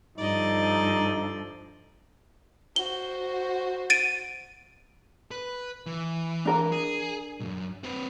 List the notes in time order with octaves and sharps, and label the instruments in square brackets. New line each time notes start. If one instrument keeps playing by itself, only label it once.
[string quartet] G2 D3 F3 [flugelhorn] D#4 [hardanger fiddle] D5 D#5
[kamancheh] F#4 C5 [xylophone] G7
[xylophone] A6 D7 D#7
[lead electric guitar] B4
E3
[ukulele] D4 A#4 A#5
[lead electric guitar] G#4
B1 F#2
C4 B4